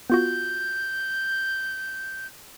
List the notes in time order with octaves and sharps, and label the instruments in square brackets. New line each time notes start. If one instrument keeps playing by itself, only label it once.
[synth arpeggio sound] B3 F4 F#4 [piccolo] G6